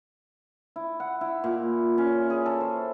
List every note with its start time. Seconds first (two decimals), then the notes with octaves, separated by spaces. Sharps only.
0.76 E4
1.00 F#5
1.21 E4
1.44 A#2
1.98 C#4
2.30 G#4
2.46 A4
2.61 C5